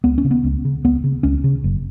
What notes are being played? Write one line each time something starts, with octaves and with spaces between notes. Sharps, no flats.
C#2 B3
C#4
C#3
B3
C#2
C#3
C#2 B3
C#3
C#2 C#4
C#3
F#1